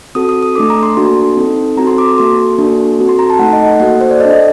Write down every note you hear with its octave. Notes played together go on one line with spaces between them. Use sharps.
C4 F#4 A4 D#6
D#6
D#6
A3 D4 A4 D6
A#5
C6
A#3 D4 F#4 A4 C6
C4 D#4 A4
C4 F#4 A4 A#5
C6
D6
C6
A#3 F#4 A4 C6
A#3 D4 F#4 A4
C4 F#4 A4
C6
A#5
A5
A3 D#4 A4 F#5
D#5
F#5
A#3 F#4 A4 F#5
C5
D5
D4 A4 D#5